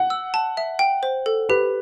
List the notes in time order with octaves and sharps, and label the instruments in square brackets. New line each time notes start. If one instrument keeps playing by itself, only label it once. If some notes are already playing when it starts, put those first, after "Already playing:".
Already playing: [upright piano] F#5
[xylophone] E6
A5
E5
G5
C5
A4
[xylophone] G4 [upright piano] B4